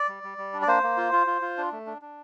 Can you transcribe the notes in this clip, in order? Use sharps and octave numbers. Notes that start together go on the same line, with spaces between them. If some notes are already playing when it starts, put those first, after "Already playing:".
Already playing: D5
G3
G3
G3
D4
D5
A#3 C5
A#3
F4
F4
F4
F4
D4
A3
D4
D4